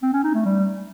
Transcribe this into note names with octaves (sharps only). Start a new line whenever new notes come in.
C4
C#4
D#4
A3
G3